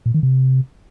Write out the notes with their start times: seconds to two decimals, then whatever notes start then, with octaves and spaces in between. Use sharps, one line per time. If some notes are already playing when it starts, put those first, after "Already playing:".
0.06 A#2
0.14 D#3
0.23 C3